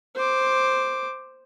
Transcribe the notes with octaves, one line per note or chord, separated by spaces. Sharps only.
C5 D6